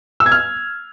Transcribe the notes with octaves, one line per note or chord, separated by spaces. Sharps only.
E6
G#6
F6